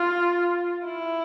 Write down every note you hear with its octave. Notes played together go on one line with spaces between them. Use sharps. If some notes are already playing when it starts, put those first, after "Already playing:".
Already playing: F4
E4